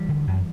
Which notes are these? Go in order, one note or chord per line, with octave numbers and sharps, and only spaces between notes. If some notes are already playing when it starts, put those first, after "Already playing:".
Already playing: E3 G3
D3
F#2